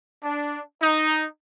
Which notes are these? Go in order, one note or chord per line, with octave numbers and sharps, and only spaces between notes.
D4
D#4